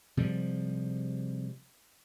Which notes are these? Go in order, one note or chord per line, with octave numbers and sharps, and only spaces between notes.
C3 F3 G3 G#3